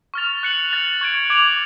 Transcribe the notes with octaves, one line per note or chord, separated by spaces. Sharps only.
C#6 F6 A6 F7
F#6 C#7 F#7
F#6 A6 F7
C#6 G#6 D7
D6 G#6 D7 F7